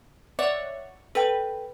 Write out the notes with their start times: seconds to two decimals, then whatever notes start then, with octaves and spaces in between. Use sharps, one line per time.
0.39 C#5 D5 E5 F#5
1.15 A4 B4 G5